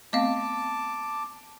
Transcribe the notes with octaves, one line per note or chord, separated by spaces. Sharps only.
A3 B3 C4 D#5 F5 A5 D6